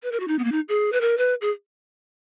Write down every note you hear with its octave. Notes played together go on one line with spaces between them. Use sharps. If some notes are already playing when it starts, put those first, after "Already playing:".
B4
A#4
F#4
D#4
B3
A#3
D#4
G#4
B4
A#4
B4
G#4